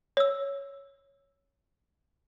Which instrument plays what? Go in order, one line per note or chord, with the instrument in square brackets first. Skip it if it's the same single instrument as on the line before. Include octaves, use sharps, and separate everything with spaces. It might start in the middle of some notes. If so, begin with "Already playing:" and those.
[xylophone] C#5 E6